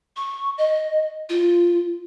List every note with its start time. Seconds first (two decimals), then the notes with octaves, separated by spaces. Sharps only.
0.16 C#6
0.58 D#5
1.30 F4